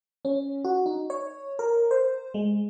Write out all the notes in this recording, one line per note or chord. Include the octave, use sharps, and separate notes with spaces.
C#4
F#4
D#4
C#5
A#4
C5
G#3